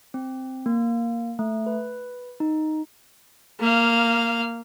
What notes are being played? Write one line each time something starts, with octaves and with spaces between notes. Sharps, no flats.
C4
A#3
A3
B4
D#4
A#3 F5